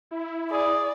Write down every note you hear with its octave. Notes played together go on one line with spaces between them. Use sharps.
E4
G#4 D5